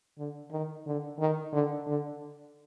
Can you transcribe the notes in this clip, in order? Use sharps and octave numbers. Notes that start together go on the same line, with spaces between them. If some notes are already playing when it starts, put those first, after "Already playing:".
D3
D#3
D3
D#3
D3
D3